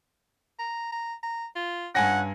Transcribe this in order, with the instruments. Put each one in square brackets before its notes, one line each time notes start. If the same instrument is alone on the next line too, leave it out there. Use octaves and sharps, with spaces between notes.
[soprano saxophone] A#5
A#5
A#5
F4
[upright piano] G2 G#5 A#6 [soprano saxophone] C#4 [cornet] F#5